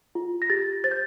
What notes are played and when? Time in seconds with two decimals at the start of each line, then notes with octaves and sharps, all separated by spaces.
0.15 F4
0.42 A#6
0.50 G4 A6
0.84 C5 A6
0.91 G6